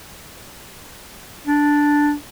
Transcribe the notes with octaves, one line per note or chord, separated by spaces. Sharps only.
D4